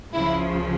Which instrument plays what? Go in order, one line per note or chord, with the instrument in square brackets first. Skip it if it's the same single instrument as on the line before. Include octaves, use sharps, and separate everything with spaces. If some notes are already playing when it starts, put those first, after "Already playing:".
[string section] C#2 C#3 F3 E4